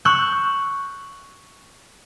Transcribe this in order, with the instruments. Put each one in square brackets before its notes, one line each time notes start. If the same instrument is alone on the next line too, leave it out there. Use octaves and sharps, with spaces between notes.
[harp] C#6 E6 F#6 G6